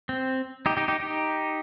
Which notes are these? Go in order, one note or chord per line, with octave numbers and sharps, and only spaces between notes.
C4
D#4 G4
D#4 G4
D#4 G4
D#4 G4